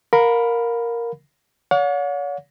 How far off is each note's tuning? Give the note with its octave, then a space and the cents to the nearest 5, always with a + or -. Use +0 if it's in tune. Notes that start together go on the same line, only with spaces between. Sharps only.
A#4 +0 F5 +35 B5 +5
C#5 +40 F#5 -45